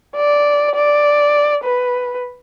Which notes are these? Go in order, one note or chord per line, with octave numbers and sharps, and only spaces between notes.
D5
D5
B4